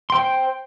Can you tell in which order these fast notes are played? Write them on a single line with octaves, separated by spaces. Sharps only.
C6 G5 C5